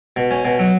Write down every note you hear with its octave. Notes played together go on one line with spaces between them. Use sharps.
B2
C#4
B2
F#3